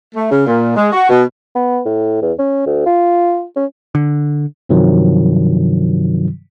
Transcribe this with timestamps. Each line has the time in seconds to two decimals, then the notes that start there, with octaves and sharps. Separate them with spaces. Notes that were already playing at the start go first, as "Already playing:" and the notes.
0.15 A3
0.31 C#3
0.47 A#2
0.76 G#3
0.93 F#4
1.09 B2
1.55 B3
1.86 A2
2.22 E2
2.39 C#4
2.66 D2
2.86 F4
3.56 C#4
3.95 D3
4.69 G2 C3 D#3 F3 F#3